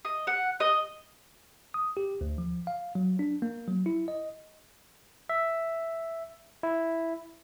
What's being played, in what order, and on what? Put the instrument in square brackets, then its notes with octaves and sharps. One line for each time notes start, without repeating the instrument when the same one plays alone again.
[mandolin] D#5
F#5
D#5
[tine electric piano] D#6
G4
D2
F3
F5
F#3
D4
A#3
F#3
E4
D#5
E5
E4